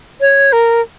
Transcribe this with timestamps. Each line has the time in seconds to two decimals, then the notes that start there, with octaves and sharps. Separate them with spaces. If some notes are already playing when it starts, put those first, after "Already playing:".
0.21 C#5
0.53 A#4